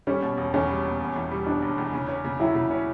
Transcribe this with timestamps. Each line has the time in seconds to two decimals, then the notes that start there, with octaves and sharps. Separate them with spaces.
0.07 G3 C#4
0.22 B2
0.37 E1
0.54 E2 C#4
0.69 G3
0.85 B2
1.00 E1
1.16 E2
1.31 G3
1.47 B2 D4
1.62 E1
1.78 E2
1.93 C#3
2.08 C#4
2.24 C#3
2.40 F#3 E4
2.55 C#3
2.70 C#4